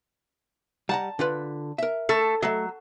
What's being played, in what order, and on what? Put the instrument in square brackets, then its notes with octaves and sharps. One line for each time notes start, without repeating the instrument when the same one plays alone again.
[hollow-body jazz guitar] G3 F#5 A#5 [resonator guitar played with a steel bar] A5
[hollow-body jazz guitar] D3 F4 B4
A#4 E5
[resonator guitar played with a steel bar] A3 A4
[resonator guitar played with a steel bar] F#3 [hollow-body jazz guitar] A3 A4 D#5